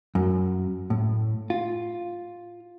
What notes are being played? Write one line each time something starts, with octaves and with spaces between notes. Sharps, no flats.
F#2
A2
F4